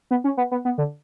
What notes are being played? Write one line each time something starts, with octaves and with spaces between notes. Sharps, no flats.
B3
C#4
B3
B3
B3
D3